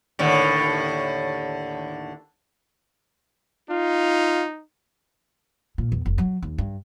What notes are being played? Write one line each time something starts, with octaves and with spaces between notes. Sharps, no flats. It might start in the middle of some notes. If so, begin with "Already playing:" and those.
D#2 A2 D3
D#4 F4
A#2
E2
F1
F#3
D#2
G2